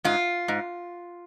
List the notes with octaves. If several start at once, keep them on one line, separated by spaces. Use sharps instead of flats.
G#2 F4
G#2